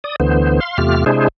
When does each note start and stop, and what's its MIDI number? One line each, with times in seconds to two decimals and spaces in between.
0.04 0.16 74
0.04 0.16 87
0.20 0.60 38
0.20 0.60 50
0.20 0.60 52
0.20 0.60 59
0.20 0.60 72
0.60 0.77 77
0.60 0.77 84
0.78 1.04 40
0.78 1.04 48
0.78 1.04 57
0.78 1.04 65
0.78 1.04 67
0.78 1.04 89
1.06 1.28 48
1.06 1.28 56
1.06 1.28 62
1.06 1.28 64
1.06 1.28 68
1.06 1.28 72